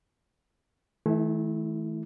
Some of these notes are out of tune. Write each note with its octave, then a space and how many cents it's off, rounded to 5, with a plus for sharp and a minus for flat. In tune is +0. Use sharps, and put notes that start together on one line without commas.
D#3 +45 A3 -30 E4 +0